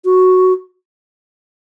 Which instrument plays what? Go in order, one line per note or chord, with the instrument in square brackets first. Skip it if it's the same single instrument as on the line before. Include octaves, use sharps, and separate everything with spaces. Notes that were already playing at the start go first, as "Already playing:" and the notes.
[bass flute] F#4